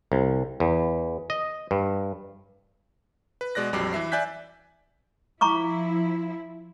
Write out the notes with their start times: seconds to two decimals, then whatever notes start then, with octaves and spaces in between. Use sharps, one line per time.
0.12 C2
0.60 E2
1.30 D#5
1.71 G2
3.41 B4
3.55 B2 G#3 D5 F#6 A#6
3.73 A#1 F2 F#3 G3 D6 C7
3.93 E3 B4 E5 C7
4.12 D5 E5 G#5 F#6 G6 B6
5.41 F3 E4 A#5 C#6 D6